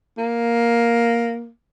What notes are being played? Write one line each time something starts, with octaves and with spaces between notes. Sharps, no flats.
A#3